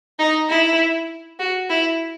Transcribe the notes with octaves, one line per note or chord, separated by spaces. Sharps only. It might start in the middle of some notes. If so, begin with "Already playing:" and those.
D#4
E4
F#4
E4